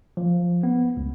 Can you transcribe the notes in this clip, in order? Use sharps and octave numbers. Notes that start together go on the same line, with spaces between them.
F3
B3
C#2